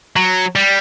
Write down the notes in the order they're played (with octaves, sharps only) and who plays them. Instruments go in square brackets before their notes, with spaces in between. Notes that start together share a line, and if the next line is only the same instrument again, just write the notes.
[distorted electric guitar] F#3
G3